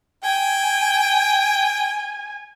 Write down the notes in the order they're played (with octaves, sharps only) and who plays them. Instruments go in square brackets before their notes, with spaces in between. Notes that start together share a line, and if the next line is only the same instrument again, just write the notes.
[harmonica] G5 [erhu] G#5